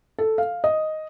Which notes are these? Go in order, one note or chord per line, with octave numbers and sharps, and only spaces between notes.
A4
F5
D#5